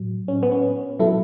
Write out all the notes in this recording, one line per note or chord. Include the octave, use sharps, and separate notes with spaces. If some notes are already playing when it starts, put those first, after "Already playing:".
Already playing: A2 F#3
C#4
B3
C#4
B2 F#3 E4 A4